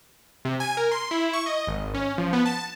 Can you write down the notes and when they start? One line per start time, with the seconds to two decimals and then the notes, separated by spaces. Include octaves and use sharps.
0.45 C3
0.60 G#5
0.77 A#4
0.91 C6
1.11 E4
1.33 C#6
1.46 D#5
1.67 G#1
1.94 C#4
2.18 F3
2.33 B3
2.46 A5